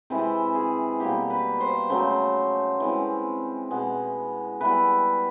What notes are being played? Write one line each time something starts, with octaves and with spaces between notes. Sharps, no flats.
C3 E3 G#3 C5
G#4
B2 G3 A#3 G4
B4
C5
C#3 F#3 A3 C5
E3 G#3 C4
B2 G#3 B3
E3 G3 B3 B4